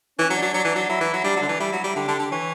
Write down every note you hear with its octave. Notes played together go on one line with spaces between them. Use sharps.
E3 C#4
F#3
D4
F#3
F#3 D4
E3
F#3
F#3 E4
E3
F#3
G3 D4
F#3
D3
E3
G3 E4
F#3
G3
D3 G4
D3
D3
E3 C#5